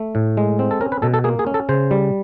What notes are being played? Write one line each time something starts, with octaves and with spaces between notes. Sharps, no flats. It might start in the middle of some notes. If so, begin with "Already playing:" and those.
Already playing: A3
A2
G#3
C4
A4
C#4 A#4
B4
B2 A4
A4
A#3 G#4
G#4
C#4
A4
C#3 C5
G3